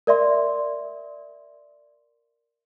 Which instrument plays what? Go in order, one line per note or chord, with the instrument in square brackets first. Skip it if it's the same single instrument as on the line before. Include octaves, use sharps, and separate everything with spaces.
[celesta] A#4 D5 E5 C6